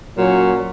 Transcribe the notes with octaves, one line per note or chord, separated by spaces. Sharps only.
A#2 F#3 C#4